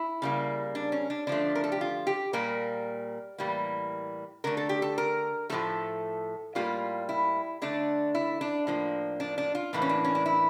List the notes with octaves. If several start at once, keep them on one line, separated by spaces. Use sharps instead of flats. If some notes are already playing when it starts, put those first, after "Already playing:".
Already playing: E4
C#3 G3 A#3
D4
C#4
D4
D3 F3 A3 D4
A#4
A4
G4
F4
G4
A#2 G3 A#3 A#4
A2 E3 G3 A#3
D3 A3 A#4
A4
G4
A4
A#4
A2 F3 A3 A4
A2 G3 A#3 F4
E4
D3 A3 D4
E4
D4
A2 F3 A#3
D4
D4
F4
A2 E3 A#3 D4
C#4
D4
C#4
D4
E4